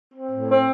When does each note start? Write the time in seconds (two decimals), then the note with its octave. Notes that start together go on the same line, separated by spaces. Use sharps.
0.12 C4
0.30 A2
0.49 C4